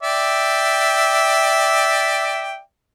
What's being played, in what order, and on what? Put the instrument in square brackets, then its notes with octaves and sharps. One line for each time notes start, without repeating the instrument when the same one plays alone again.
[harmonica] D5 E5 G5